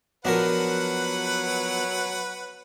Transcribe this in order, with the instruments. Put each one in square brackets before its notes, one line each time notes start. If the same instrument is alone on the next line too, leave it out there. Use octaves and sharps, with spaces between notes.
[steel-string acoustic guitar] F3 B3 [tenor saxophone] F#3 [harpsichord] D4 F#4 A#4 [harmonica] B4 F#5